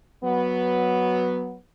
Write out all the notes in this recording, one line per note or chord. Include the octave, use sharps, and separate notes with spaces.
F#3 B3